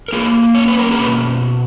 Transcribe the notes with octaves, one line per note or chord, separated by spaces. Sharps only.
A#4
A#3 F4 G#4
C#4 C#5
B4
A#4
G#4 B4
B2